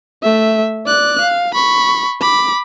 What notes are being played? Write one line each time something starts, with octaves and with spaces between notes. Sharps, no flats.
A3 E5
D5 F#6
F5
B5 C#6
B5 D6